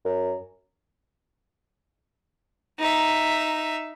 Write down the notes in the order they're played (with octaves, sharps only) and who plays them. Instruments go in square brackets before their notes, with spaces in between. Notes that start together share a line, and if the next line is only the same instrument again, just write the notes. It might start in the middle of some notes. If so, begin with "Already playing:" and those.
[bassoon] F#2
[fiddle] D#4 E5